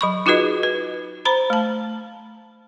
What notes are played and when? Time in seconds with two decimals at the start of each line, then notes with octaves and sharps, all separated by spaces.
0.01 F#3 B5 C#6
0.26 D#4 F4 F#4 G#4 B4 D#5
0.63 B4
1.25 C5 A#5 B5
1.50 A3 A5